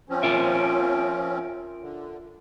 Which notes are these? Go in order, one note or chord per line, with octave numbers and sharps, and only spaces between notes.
F3 C4 C#4
F4 A#4 E5
D3